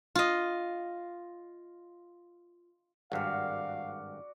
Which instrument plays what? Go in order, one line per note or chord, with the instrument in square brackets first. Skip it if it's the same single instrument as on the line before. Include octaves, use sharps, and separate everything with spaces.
[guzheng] F4 D#5
[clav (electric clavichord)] G#1 G2 [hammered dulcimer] F#4 D5 [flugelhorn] F5 [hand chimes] F#5 F6